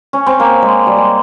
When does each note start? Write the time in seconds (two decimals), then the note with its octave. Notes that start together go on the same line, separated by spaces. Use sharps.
0.13 C#4
0.26 C4
0.40 A#3
0.62 G#3
0.87 G3
0.97 G#3